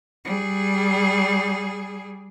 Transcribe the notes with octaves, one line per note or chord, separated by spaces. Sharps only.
G3 G#4